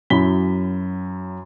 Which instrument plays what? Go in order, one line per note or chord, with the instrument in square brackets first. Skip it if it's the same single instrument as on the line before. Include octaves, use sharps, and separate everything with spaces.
[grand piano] F#2 F#3 E4 B5 B6 G7